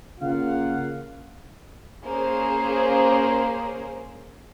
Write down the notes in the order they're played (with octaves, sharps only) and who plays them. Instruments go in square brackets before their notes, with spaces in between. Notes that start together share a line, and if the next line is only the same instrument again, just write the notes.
[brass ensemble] C#3 A#3 F4 F5 F#5
[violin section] A#3 C#4 G#4 C5